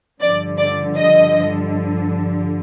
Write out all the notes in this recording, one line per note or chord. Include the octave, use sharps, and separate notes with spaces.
G2 D3 F3 D5
D5
D#5